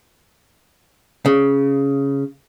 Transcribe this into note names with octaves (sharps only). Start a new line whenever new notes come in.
C#3